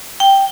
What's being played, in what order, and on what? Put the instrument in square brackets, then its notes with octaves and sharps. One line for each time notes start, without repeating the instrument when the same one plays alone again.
[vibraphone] G5